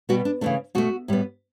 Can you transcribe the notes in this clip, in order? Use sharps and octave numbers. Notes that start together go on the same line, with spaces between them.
B2 G3 B3 F#4
D4
C#3 E3 A3 D4
B2 A3 F#4
A2 G3 B3